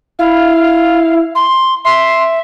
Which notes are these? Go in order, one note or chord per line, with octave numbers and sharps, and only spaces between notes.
E4 F5
C6
E5 C6